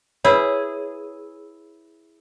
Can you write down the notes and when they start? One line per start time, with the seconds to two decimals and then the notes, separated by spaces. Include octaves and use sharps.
0.24 E4 G#4 B4 C#5